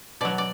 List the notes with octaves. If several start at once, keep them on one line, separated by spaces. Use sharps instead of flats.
B2 F#3 D5
D5